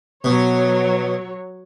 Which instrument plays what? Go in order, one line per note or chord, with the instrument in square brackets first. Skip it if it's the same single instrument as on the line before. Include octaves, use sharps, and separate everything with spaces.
[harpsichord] B2 [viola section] F#3 C#5